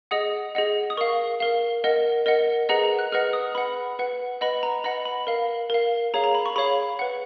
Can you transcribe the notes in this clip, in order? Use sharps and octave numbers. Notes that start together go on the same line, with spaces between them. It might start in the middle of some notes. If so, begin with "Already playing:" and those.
G#4 D#5 F#5 D#6
G#4 D#5 F#5
D#6
A#4 F5 C#6
A#4 F5
A#4 D#5 F#5
A#4 D#5 F#5
G#4 B4 D#5 F#5 A#5
A#5
F#6
G#4 B4 D#5 F#5 F6
D#6
B4 F#5 B5
B4 F#5
B4 D#5 F#5 B5
A#5
B4 D#5 F#5 B5
B5
A#4 F5
A#4 F5
G#4 C#5 F5 A#5
A#5
B5
C#6
G#4 C#5 F5 B5
B4 F#5